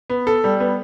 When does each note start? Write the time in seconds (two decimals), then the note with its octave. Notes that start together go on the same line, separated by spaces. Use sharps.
0.10 B3
0.27 A4
0.44 G3
0.60 B3